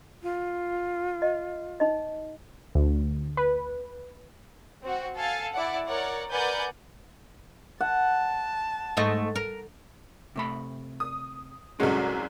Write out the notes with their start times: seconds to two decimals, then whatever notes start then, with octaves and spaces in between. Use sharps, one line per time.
0.23 F4
1.22 D#5
1.80 D#4 D#5
2.75 D2
3.37 B4
4.82 C4 F#4
5.17 A4 F5 G#5 A5
5.53 E4 D5 F#5
5.87 A#4 C#5 D5 F#5
6.30 A#4 B4 D5 F#5 G#5 G6
7.81 F#5 A5
8.97 G#2 A3 D#5
9.36 A#4
10.36 C3 A3 B5
11.00 D#6
11.80 C2 F#2 G#3 C#4 F#4 A4